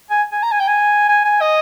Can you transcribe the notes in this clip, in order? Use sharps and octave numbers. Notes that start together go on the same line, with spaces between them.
G#5
G#5
A#5
G#5
G5
G#5
G#5
G#5
D#5